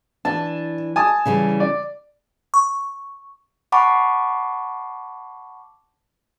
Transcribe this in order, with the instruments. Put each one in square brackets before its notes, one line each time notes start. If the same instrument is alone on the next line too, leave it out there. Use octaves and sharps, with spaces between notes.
[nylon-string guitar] E3 D4 [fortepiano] A5
[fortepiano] G#5 A5 D#6
[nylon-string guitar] C#3 E3 G3
[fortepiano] D5
[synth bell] C#6
[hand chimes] F#5 A5 B5 C#6 D6